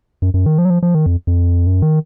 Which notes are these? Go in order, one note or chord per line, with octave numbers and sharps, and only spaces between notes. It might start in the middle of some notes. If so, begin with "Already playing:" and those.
F#2
F#2
D#3
F3
F#3
F3
F3
D#3
F2
F2
F#2
D#3